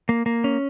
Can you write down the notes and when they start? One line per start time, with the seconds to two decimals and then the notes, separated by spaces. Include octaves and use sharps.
0.09 A#3
0.26 A#3
0.44 C#4